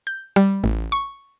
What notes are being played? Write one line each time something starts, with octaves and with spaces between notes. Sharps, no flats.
G6
G3
A1
C#6